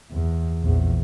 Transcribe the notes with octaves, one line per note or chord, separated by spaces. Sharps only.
E2
A#1 E2